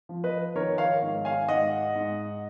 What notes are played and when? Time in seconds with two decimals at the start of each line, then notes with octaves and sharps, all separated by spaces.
0.09 F3
0.24 B4 D#5
0.55 D#3 A#4 C#5
0.78 C#5 F5
1.02 G#2
1.25 F5 G#5
1.48 G#2 D#5 F#5
1.95 G#2